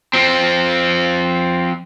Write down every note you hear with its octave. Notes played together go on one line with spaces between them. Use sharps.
F3 C4